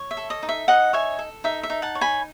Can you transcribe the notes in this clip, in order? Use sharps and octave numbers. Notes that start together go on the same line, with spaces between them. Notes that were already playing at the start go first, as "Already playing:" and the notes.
Already playing: C#5
E5
A4
D#5
D#4
E5
D#4 D#5 F#5
C#5 E5 G#5
A4
D#4 E5
E5
D#4
F#5 A5
C#5
G#5 B5